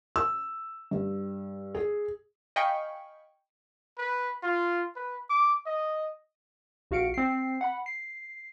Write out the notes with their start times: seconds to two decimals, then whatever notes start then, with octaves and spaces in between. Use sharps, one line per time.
0.16 E6
0.91 G2
1.75 G#4
2.56 D#5 F5 G5 G#5 B5 C#6
3.98 B4
4.43 F4
4.96 B4
5.30 D6
5.66 D#5
6.91 A#1 F#4 F5 C#7 D7
7.14 C4 C7
7.61 F#5 B5
7.86 C7